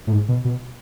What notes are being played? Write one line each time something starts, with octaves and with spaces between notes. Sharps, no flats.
A2
G#2
B2
B2